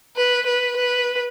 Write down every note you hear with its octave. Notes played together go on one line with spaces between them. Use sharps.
B4
B4
B4